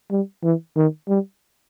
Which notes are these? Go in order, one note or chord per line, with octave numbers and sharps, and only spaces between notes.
G3
E3
D#3
G3